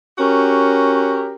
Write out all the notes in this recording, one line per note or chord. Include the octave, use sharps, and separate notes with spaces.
C#4 F#4 G4 A#4